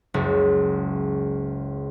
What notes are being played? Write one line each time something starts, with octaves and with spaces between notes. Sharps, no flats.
F#1 C#2